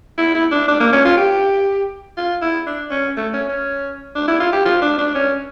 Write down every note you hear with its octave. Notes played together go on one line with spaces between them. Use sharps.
E4
E4
D4
D4
A#3
C#4
F4
G4
F4
E4
D4
C#4
A3
C#4
C#4
D4
E4
F4
G4
F4
D4
D4
C#4